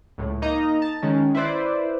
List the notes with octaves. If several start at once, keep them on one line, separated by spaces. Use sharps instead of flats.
C#2 A2
A#3 D#4 D#5 A#5
A5
D#3 G#3 C#4
E4 B4 C5 D5